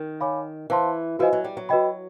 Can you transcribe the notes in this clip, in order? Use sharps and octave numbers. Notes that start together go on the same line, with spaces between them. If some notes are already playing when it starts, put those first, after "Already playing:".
Already playing: D#3
C#5 F5 G#5 B5 D6
E3 C5 F5 A5 C6
F3 F#4 B4 D#5 G#5
F#3
G3
F#3
F#4 B4 D#5 G5 B5